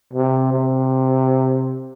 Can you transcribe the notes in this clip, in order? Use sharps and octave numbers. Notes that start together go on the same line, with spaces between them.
C3
C3